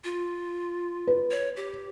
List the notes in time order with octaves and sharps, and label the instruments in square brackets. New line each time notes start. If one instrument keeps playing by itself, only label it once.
[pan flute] F4
[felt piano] B4
[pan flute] C#5
G4